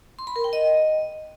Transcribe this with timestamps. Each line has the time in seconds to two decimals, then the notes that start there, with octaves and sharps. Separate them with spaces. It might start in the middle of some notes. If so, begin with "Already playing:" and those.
0.19 C6
0.27 B5
0.36 A#4
0.44 G5
0.53 D#5